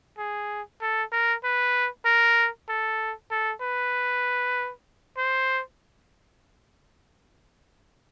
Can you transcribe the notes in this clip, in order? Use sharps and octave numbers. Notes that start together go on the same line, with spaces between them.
G#4
A4
A#4
B4
A#4
A4
A4
B4
C5